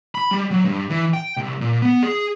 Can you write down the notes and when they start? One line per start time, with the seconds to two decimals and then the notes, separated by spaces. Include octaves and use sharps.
0.15 B5
0.31 G3
0.51 F#3
0.65 G2
0.90 E3
1.13 G5
1.37 C2
1.61 A#2
1.82 B3
2.03 G#4